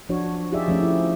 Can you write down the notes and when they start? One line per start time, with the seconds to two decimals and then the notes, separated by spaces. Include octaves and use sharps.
0.09 F3 D4 F#4 C#5
0.52 D#4 F4 G4 G#4 D5 E5
0.68 F3 A3 C#4
0.82 E4